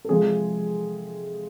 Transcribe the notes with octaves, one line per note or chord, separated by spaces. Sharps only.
A4
C3 F3 G#3 G#4